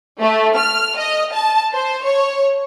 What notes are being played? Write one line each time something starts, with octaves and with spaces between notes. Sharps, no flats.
A3
F6
D#5
A5
C5
C#5